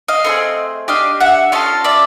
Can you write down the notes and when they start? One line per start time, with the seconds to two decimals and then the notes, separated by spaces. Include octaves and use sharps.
0.08 D#5 F5
0.24 A3 C4 E4 G#4
0.88 D4 G4 D#5 F5
1.20 E5 F#5
1.52 C#4 F4 A4 D#5 F5
1.84 D5 E5